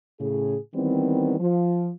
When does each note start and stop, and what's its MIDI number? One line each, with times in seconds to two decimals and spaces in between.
0.20 0.57 45
0.20 0.57 49
0.20 0.57 68
0.75 1.35 51
0.75 1.35 52
0.75 1.35 55
0.75 1.35 59
0.75 1.35 60
1.40 1.90 53